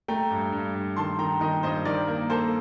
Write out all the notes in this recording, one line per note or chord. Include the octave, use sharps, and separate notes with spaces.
A3 G5 A#5
G2
G2
G2
D#3 A5 C6
D#3 G5 A#5
D#3 D#5 G5
G2 C5 D#5
D#3 A#4 D5
A#3 A#4
A#3 A4 C5